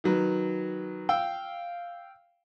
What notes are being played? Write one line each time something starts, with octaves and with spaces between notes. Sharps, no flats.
D#3 F#3 B4
F5 G5 E6